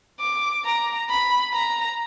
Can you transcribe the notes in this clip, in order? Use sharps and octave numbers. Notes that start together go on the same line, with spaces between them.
D6
A#5
B5
A#5